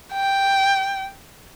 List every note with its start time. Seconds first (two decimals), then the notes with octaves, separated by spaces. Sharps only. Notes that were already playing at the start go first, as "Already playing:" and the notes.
0.13 G5